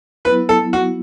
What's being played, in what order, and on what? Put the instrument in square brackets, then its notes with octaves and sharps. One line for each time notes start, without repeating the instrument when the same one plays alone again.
[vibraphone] F#3 B3 E4 [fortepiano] B4
[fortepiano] A4
F#4